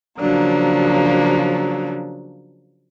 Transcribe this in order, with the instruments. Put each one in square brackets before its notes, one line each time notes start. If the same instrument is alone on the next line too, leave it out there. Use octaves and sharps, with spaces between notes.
[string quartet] C#3 F3 F#3 A#3 D4